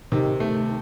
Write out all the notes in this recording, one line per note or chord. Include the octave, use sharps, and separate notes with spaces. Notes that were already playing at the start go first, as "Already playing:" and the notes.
C3 D#3
A3